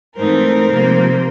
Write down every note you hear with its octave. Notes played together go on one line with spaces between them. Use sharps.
G#2 E3 A3 C4 D#4 A#4 C5
C3 F3 A#3